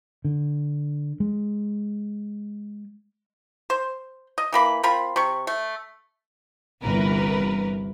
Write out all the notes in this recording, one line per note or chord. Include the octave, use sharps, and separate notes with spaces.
D3
G#3
C5
D#5
E3 A#3 B5
C4 F4 A#4 B5
C3 C#6
A3
G1 C2 E3 A#4 B4